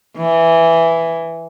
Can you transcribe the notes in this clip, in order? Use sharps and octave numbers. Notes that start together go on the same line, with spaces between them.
E3